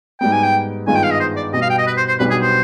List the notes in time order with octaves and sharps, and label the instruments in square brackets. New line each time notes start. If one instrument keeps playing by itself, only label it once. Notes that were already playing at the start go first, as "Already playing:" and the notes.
[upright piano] G#2 G3 B3 [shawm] G5
[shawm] G#5
G5
[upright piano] G2 D#3 G#3 B3 F4 [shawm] G#5
[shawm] G5
F5
D#5
C5
D5
[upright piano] B2 G3 B3 [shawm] D#5
[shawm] F5
G5
D#5
B4
C5
C5
[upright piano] B1 B2 G3 B3 D4 [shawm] B4
[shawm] G#4
C5